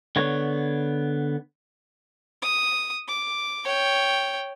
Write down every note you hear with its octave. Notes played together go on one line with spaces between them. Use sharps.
D3 B3 C#5
D#6
D6
C#5 G5